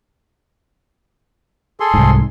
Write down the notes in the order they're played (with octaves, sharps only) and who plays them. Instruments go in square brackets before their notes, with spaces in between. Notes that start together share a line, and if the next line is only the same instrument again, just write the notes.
[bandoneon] G#4 A4 C6
[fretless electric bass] C2 G#2